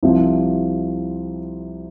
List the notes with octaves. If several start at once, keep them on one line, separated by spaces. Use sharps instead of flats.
C2 C3 F3 C4